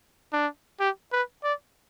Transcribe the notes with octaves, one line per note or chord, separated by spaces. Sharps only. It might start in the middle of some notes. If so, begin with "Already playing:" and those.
D4
G4
B4
D5